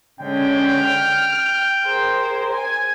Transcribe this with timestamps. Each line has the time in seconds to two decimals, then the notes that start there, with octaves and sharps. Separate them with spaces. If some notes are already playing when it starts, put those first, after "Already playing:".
0.21 D3 G#3 C#4 G5
0.82 F6
1.85 G#4 A#4 C5
2.51 G#5